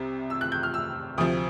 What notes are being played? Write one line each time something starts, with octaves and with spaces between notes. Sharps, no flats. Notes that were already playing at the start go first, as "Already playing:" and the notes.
Already playing: C2 C3
E6
F#6
G6
F6
E6
D2 C3 F3 D#6